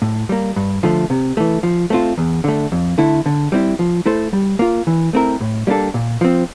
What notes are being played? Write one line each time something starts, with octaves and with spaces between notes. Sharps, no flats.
A2
G3 A#3
G2
D3 F3 A3
C3
E3 A3
F3
A3 C4 F4
E2
D3 A3
F2
D3 A3 E4
D3
G3 C4 E4
F3
A3 E4 A4 C5
G3
A#3 F4
E3
A3 C4 E4 A#4
A2
G3 A#3 D4 A4
A#2
F3 C4